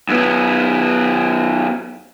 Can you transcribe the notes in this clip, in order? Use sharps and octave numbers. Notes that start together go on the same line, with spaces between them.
F#2 B3